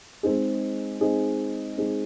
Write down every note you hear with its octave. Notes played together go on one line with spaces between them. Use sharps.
G#3 C4 D#4 G#4
G#3 C4 D#4 G#4
G#3 C4 D#4 G#4